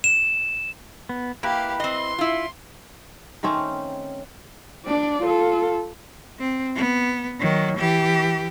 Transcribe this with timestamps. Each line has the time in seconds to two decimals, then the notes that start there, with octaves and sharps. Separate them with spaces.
0.04 E7
1.09 B3
1.43 A#3 E4 G4 B4 F5
1.80 C4 D#5 C6
2.18 E4 F4
3.43 D#3 A3 C4 C#4
4.86 D4 D5
5.22 F4 A4
6.39 C4
6.76 B3
7.40 D#3 F#3
7.77 E3 G4